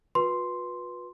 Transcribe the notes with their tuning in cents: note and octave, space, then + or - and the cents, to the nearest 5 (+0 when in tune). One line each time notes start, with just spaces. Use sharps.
F#4 -45 B4 -15 C6 +0